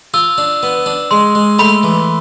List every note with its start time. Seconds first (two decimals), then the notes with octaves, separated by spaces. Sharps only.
0.14 F4 E6
0.38 D4
0.63 B3
0.86 D4
1.11 G#3 C6
1.35 G#3
1.59 A3 B5
1.83 E3